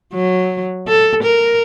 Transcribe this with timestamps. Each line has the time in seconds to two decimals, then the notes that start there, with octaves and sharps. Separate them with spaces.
0.14 F#3
0.88 A4
1.23 A#4